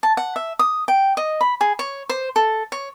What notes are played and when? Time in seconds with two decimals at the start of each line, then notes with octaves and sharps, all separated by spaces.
0.03 A5
0.17 F#5
0.36 E5
0.59 D#6
0.88 G5
1.17 D#5
1.41 B5
1.61 G#4
1.79 C#5
2.09 C5
2.36 A4
2.72 C#5